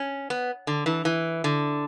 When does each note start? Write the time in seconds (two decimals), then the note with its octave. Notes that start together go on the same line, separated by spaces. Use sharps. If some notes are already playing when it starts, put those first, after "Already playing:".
Already playing: C#4
0.30 B3
0.67 D3
0.86 E3
1.05 E3
1.44 D3